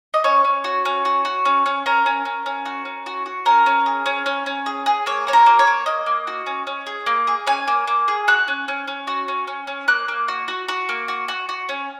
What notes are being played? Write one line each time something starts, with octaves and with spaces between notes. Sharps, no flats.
D#5
C#4 C#5
C#4
F#4
C#4
F#4
F#4
C#4
C#4
C#4 A#4
C#4
C#4
C#4
F#4
C#4
F#4
F#4
C#4 A#4
C#4
G#4
C#4
C#4
C#4
G#4
G#4
A#3 C#5
F#4 C#5
A#4
A#3
C#5
A#3
A#3 D#5
A#3
F#4
C#4
C#4
G#4
A#3
G#4
C#4 G#5
A#3
A#3
G#4
F#4 F#6
C#4
C#4
C#4
F#4
C#4
C#4
C#4
A#3 F#6
A#3
F#4
F#4
F#4
A#3
F#4
F#4
F#4
C#4